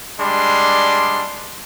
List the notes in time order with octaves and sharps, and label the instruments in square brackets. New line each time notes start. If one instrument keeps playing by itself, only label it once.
[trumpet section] G3 G#3 D4 C6